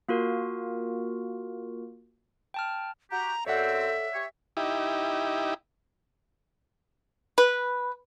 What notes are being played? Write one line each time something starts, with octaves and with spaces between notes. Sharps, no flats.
A#3 F4 F#4 A#4
G5 A5 F6
F#4 G4 A#5
F#2 C4 A4 C#5 D5 E5 F#5
G4 C#5
D#4 E4 G4
B4